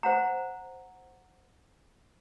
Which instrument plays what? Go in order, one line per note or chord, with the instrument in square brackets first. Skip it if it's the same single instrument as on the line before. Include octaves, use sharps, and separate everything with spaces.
[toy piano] C5 F#5 A#5